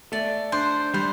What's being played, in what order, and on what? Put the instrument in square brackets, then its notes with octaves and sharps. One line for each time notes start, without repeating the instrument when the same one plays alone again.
[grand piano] A3 [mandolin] D5
[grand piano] D4 [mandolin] C5
[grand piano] G3 [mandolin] C5